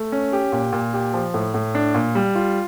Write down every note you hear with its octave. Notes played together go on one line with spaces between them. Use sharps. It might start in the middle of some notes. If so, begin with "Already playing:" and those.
Already playing: A3
C#4
G4
A#2
A#2
G4
F3
A2
A2
D4
A#2
G3
F4